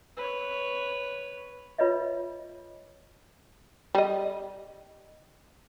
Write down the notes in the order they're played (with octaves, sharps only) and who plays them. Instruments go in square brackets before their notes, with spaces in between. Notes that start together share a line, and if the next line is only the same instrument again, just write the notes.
[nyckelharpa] B4 C#5
[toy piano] F4 B4 C#5 D#5 E5
[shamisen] G3 D#5